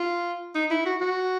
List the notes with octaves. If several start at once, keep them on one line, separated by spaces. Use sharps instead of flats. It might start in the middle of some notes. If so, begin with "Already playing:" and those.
Already playing: F4
D#4
E4
F#4
F#4